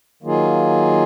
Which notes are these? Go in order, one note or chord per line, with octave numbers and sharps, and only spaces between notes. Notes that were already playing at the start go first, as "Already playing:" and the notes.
D#3 F#3 A#3 F4 G#4